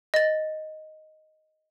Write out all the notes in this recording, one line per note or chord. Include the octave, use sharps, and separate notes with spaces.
D#5 A6